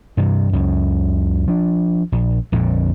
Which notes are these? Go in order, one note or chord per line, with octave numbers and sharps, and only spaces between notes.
G2 C3 E3
C#2 F#2 C#3
F3 D4
A#1
A#1 F2 A#2 D3